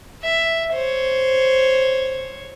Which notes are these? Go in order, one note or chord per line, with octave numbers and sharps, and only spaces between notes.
E5
C5 C#5